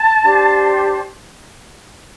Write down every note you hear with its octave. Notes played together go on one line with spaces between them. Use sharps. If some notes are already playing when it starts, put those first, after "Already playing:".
Already playing: A5
D4 G4 C5